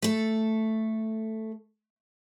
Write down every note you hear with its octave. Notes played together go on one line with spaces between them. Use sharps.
A3 A4